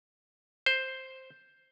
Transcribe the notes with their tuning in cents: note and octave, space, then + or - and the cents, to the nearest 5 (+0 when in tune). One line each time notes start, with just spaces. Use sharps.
C5 +5